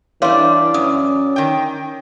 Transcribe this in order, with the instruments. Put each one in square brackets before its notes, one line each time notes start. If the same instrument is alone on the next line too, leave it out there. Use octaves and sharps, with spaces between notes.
[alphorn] E3 [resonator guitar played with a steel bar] G3 D4 [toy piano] C#5 F5 C6 [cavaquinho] D5
[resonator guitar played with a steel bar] F#2 [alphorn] C#4 [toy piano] D#6
[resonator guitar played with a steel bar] D#3 G5